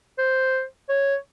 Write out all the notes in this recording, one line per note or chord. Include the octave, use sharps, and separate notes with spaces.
C5
C#5